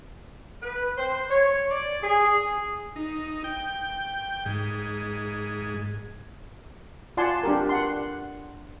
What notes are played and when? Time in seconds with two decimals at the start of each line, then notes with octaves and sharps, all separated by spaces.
0.62 B4
0.97 C5
1.29 C#5
1.70 D5
2.02 G#4
2.96 D#4
3.44 G5
4.46 G#2
7.17 F4 D5 F#5 G#5 A5 C6
7.43 D4 G4 A#4
7.69 F#5 C6